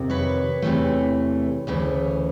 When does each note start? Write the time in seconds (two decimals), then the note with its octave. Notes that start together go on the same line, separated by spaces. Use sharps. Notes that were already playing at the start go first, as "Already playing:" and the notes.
Already playing: F2 C3 D#3
0.10 B4 C#5
0.62 E2 C3 E3 A3
1.67 D2 C#3 E3 A3